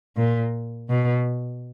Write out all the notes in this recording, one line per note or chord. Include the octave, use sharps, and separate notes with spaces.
A#2
B2